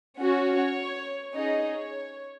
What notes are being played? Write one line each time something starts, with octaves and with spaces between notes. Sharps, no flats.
C#4 F#4 C#5
C#4 D#4 G#4 D#5
C#5